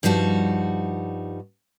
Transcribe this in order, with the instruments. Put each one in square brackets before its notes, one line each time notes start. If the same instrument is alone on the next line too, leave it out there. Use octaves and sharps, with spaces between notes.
[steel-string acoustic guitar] G2 F3 G3 D#4 F#4